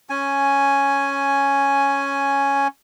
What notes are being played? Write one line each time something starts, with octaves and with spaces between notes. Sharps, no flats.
C#4 G#5